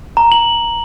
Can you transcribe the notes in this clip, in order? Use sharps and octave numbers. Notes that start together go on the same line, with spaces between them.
A#5
F#7